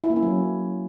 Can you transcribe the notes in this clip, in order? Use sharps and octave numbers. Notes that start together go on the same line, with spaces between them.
E4
A#3
C#4
F#3